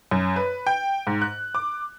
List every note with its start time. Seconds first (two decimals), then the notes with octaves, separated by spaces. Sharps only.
0.11 F#2
0.36 B4
0.67 G5
1.07 G#2
1.22 F#6
1.55 D6